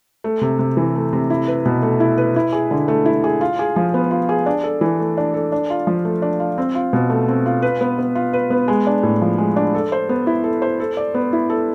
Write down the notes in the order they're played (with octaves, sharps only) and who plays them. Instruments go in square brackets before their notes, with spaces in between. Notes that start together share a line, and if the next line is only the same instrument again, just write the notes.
[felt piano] A3
C3
C3
E3
A3
C3
E4
B4
B2
A3
E4
B4
E4
G#4
D3
A3
E4
G#4
F4
G#4
F3
B3
F4
G#4
D4
A4
E3
A3
D4
A4
D4
F4
F3
A3
D4
F4
C4
F4
B2
A3
C4
F4
B4
B3
B3
F4
B4
B3
G#3
D4
A2
F3
G#3
D4
A4
C5
B3
E4
A4
C5
A4
D5
B3
E4
A4